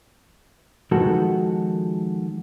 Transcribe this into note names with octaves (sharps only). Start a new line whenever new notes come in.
D#3 F3 G#3 B3 F#4 A4